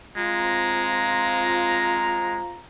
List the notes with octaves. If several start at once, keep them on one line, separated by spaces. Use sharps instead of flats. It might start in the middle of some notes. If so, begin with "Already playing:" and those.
G#3 C4 F4 A#5